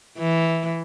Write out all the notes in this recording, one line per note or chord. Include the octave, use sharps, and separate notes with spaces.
E3